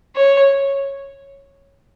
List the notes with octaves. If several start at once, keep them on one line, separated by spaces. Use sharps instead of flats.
C#5